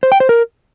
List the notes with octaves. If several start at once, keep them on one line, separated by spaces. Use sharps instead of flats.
C5
G5
C5
A#4